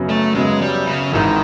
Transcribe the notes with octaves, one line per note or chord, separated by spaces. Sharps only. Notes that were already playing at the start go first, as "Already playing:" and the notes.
Already playing: F#2 C#3 F#3 B3
A3
F#2 C#3 F#3 G#3 B3
G3
C#3
G#1 G#2 D#3 E3